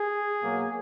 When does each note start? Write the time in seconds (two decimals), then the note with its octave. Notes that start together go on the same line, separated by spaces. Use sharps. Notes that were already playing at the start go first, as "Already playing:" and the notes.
Already playing: G#4
0.42 B2 F#3 A#3